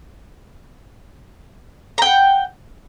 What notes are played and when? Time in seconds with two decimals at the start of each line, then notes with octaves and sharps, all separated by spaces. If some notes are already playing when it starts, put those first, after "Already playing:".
1.98 A#5
2.02 G5
2.06 F#5